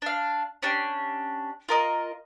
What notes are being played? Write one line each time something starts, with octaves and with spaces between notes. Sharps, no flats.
D4 F5
C#4 D4 G4
F4 A#4 D#5